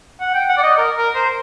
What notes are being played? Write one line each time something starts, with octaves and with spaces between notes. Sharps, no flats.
F#5
G5
F#5
D5
D#5
A#4
A#4
C5